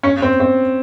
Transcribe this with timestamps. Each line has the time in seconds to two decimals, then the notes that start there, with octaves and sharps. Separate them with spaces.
0.03 C#4
0.22 C4
0.40 C4